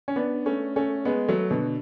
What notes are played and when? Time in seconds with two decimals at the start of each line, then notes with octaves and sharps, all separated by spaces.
0.08 C#4
0.16 B3 D4
0.46 A3 C#4
0.76 A3 C#4
1.05 G#3 B3
1.28 F#3 A3
1.51 B2 D3